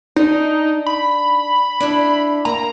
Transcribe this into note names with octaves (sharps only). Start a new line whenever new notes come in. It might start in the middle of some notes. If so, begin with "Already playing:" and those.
D4 D#4
B5
D4 E4 A4
A#3 A#5